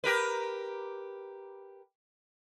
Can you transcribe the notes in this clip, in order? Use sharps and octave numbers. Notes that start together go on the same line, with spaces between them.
G4 A#4 B4